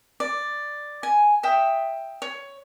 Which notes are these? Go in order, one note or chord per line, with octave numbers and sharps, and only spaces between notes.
D5
G#5
E5 G5 D#6
C#5